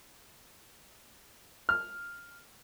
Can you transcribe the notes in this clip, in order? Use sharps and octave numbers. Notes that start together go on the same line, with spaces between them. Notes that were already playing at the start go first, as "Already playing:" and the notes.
F6